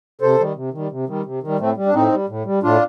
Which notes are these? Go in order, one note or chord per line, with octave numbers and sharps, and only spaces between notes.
C3 A4 C5
D#3 G3
C3
D#3 G3
C3
D#3 G3
C3
D#3 G3
A2 A3 C4
G3
D4
A2 C4 D#4
G3
A2
G3
A2 D4 F4